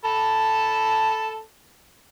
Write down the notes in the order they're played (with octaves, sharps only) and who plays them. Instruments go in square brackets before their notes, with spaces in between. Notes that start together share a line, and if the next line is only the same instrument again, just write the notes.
[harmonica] A4 A5 B5